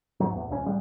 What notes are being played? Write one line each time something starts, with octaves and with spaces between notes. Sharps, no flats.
G#2 F#3
A1 E2
D#1 C#2 C3 C#4
A1 G3 G#3